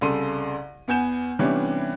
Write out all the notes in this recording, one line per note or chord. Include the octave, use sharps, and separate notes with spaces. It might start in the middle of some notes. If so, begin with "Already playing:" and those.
C2 C#3 A4 C6 D#7
E2 B3 G#5 G6 E7
C3 E3 G3 B3 C#4 D4